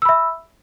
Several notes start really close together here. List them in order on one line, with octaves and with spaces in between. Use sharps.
E6 B5 E5